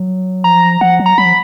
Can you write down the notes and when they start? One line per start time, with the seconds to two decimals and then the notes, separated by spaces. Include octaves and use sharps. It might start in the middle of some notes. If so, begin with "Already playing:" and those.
Already playing: F#3
0.44 F3 A#5
0.81 F3 F#5
0.99 F#3
1.06 A#5
1.18 F#3 B5
1.25 F3